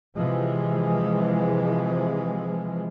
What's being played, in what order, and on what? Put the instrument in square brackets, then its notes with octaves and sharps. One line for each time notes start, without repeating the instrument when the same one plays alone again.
[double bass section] C3 E3 F3 G#3